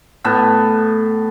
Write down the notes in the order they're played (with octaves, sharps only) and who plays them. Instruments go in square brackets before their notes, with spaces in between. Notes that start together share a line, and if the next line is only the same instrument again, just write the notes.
[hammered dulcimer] A2 B3 A5